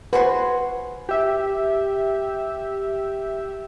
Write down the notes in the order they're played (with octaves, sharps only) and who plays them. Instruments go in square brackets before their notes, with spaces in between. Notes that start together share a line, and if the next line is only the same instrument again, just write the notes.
[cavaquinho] F#4 G#5 C6 [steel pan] B4 C5
[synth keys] G4 E5